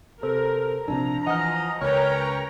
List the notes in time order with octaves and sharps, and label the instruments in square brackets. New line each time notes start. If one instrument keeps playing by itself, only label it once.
[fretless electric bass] C3 [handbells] A4 C5 [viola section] A#4
[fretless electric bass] A#1 C3 C4 [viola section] F3 A#5 [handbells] D4
[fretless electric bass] E3 [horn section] D#5 [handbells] F#5 G#5 F6
[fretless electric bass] C#2 [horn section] C#4 B4 C#5 [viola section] A#4 G5 A#5 [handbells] F6